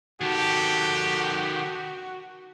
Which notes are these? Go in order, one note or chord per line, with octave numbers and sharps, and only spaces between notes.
D#3 F#4 G4 A4